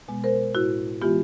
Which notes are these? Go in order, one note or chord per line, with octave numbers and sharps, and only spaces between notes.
B2 G#3 B3
A#4 C5
A2 E4 F#4
E3 G#3 B3 F4 G4